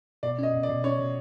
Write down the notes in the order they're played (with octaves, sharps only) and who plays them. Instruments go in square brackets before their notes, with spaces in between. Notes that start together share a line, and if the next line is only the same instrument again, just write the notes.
[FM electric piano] B2 [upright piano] D5
[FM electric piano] C#4 [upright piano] D#5
[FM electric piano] B2
[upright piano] D5
[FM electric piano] B2
[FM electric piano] C#4 [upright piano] C#5
[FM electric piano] B2